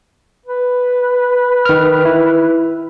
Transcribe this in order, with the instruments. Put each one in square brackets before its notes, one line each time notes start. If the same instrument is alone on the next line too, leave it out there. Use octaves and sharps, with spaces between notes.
[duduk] B4
[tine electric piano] D#3 F6
E4